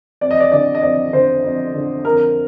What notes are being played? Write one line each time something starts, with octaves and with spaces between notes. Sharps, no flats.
F2 D5
D#5
D5
D3 D5
D#5
F2 D5
D3 C5
F2
D3
F2 A#4